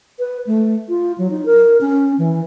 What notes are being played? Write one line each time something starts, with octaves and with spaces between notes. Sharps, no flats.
B4
A3
F4
F#3
D#4
A#4
C#4
E3